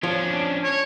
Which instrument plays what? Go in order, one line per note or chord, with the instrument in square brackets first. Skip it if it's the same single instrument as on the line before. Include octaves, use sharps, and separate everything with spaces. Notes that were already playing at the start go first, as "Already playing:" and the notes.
[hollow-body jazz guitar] F3 [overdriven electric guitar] C#4 D4
[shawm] C#5